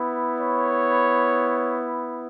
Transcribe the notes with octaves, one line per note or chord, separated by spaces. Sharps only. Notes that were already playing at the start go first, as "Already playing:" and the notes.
Already playing: B3 E4
C#5